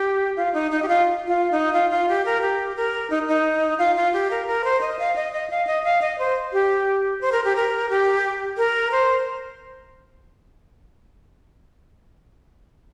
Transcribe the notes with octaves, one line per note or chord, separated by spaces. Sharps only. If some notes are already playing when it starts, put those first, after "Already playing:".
Already playing: G4
F4
D#4
D#4
G4
F4
F4
D#4
F4
F4
G4
A#4
G4
A#4
D#4
D#4
F4
F4
G4
A#4
A#4
C5
D#5
F5
D#5
D#5
F5
D#5
F5
D#5
C5
G4
C5
A#4
G4
A#4
G4
A#4
C5